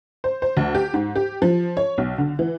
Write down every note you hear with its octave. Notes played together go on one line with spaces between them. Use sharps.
C5
C5
D2
G4
G#2
G4
F3
C#5
B1
D3
E3